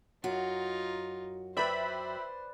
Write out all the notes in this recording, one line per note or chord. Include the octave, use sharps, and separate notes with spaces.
F#2 D#4 F4 F#4
B4 C5 D5 E5 G5 B5